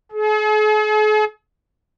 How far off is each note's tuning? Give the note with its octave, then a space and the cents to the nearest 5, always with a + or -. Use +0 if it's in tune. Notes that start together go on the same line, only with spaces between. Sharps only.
G#4 +45